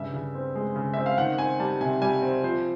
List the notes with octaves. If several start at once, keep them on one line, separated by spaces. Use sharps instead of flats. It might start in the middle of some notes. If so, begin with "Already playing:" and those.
Already playing: G2 C#3 E5
C#3
C4
G#3
C#3
C4 E5
F5
D#3 F#5
C4 G#5
G3 A5
C3 G#5
G3 G#5
C4
F3 C5